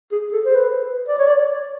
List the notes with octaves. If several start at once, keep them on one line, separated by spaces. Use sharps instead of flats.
G#4
A4
C5
B4
D5
C#5
D5